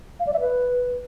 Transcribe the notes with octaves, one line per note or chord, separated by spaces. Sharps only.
F5
D5
E5
B4